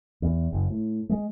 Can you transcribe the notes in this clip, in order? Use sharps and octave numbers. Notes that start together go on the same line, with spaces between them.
E2
F#1
A2
G#3